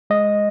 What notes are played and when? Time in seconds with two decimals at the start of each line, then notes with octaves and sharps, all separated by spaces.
0.10 G#3 D#5